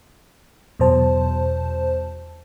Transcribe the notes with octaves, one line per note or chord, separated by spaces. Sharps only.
E2 B2 F#3 C5 A5